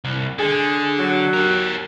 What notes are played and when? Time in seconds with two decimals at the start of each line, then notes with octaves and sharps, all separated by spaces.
0.04 C2
0.39 D3 G#3 G#4
0.98 F#3
1.33 G4 A#4